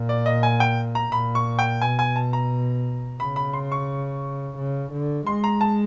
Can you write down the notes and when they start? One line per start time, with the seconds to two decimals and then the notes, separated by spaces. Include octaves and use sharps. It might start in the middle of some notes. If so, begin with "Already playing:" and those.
Already playing: A#2
0.09 D5
0.26 D#5
0.43 G#5
0.60 G5
0.95 A#5
1.12 A#2 B5
1.35 C#6
1.59 G5
1.82 B2 G#5
1.99 G#5
2.16 A5
2.33 A#5
3.20 C#3 B5
3.36 B5
3.53 C6
3.72 C#6
4.58 C#3
4.92 D3
5.26 G#3 C6
5.44 A#5
5.61 A5